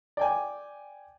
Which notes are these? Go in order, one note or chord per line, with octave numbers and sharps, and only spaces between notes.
D5 G5 G#5